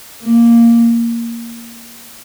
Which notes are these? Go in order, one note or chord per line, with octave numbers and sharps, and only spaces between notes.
A#3